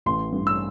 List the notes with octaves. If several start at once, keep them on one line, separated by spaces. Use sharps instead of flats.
A1 C6
G2
E6